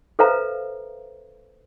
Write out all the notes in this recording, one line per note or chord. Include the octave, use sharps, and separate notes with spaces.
A4 B4 C5 E5 F5 A#5